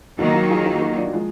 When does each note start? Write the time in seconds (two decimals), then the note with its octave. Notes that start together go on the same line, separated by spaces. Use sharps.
0.19 D#3 F#3 A#3 F#4 A#4
0.34 F#4 A#4
0.50 F4 G#4
0.66 D#4 F#4
0.81 D#4 F#4
0.97 D4 F4
1.07 F#3
1.13 F3 G#3